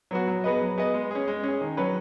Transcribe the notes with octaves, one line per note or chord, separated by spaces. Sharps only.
F#3 B3 F#4
F#3
B3 G#4 B4 D#5
F#3
B3 G#4 B4 D#5
G#3
C#4 G#4
G#3
C#4 G#4
D#3
F#3 C#4 B4